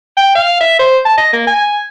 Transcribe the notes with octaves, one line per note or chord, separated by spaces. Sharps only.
G5
F5
E5
C5
A5
D#5
A#3
G#5